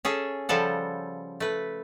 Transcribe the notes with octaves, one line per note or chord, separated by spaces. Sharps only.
C#4 G#4 A4 E5
C#3 F3 G3 A4 F#5
A3 B4